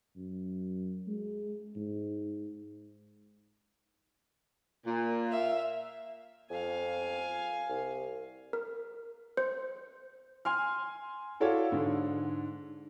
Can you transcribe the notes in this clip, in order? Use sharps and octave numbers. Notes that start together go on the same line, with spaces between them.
F#2
G#3
G#2
A#2
E5 F5
F2 F5 G#5
C2
A#4
C5
G#5 C6 F6
E4 F#4 A4 C#5 D5 F5
G#2 D3